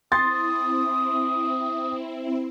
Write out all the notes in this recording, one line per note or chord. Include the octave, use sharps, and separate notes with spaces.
C4 E4 C6 D#6 A6